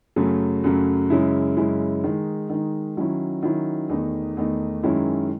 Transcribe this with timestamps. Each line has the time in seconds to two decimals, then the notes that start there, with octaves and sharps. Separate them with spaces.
0.16 F#2 C#3 F#3 A3
0.64 F#2 C#3 F#3 A3
1.10 F#2 C#3 G#3 C#4 E4
1.57 F#2 C#3 G#3 C#4 E4
2.04 D#3 G#3 D#4
2.50 D#3 G#3 D#4
2.97 D#3 F#3 C#4 E4
3.43 D#3 F#3 C#4 E4
3.89 E2 D#3 A3 D#4
4.37 E2 D#3 A3 D#4
4.83 F#2 D#3 G#3 C#4 E4